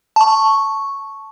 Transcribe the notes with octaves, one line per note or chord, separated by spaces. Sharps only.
A5 C#6